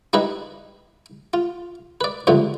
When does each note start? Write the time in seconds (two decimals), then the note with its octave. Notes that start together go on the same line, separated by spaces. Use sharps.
0.13 G3 D#4 E4 B4 D#5
1.34 F4
2.01 B4 D5
2.27 C#2 G2 D3 F3 A3